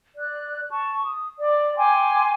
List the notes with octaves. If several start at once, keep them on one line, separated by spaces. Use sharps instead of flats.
D5 F#6
A5 C#6
D#6
D5
G5 G#5 C6 D6